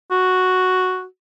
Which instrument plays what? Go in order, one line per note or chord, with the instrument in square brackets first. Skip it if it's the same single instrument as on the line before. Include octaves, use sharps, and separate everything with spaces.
[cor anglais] F#4